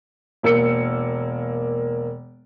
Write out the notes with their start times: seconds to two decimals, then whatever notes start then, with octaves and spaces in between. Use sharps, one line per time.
0.43 E1 A#3 E6 C#7